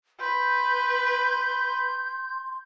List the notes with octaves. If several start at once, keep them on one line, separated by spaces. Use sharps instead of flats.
B4 C6 G6